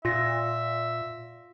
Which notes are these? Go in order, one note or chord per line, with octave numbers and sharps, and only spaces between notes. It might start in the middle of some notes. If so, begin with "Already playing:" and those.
A#2 F4 E5 A#6